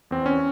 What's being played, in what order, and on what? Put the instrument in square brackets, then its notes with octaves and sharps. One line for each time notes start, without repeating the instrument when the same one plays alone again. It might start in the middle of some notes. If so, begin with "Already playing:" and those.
[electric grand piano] E2 C4
C#4